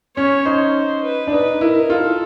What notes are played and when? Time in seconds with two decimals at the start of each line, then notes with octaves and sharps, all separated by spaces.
0.16 C#4 C#5
0.45 D#4 C5
1.03 B4
1.27 D4
1.32 D#4 B4
1.61 E4 A#4
1.90 F4 A4